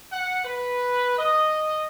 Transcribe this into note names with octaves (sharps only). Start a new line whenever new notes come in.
F#5
B4
D#5